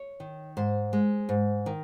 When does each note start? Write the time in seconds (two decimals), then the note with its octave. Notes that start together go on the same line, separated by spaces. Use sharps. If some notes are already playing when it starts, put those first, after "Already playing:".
Already playing: C#5
0.20 D#3
0.57 G#2 C5
0.93 G#3
1.29 G#2
1.66 D#3